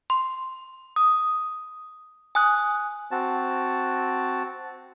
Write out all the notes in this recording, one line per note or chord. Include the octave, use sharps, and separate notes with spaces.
C6
D#6
G#5 D#6 F#6
C4 F#4 A5